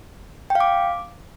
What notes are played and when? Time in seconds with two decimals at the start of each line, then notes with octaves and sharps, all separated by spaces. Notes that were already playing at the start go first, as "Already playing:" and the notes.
0.50 G5
0.55 F5
0.60 D6